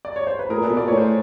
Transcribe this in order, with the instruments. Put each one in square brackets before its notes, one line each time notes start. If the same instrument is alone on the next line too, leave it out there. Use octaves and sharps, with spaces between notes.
[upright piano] D5
C#5
C5
B4
[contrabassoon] A2 [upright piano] G#4 A#4
[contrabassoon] A#2
[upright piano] A4 B4
[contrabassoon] B2
[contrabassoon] A#2 [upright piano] D5
[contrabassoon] A2 [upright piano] C#5
[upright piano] C5